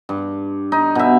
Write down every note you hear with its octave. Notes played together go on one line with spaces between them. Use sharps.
G2
D#4
B2 E5